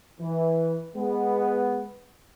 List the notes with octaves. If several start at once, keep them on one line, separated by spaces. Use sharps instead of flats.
E3
G#3 B3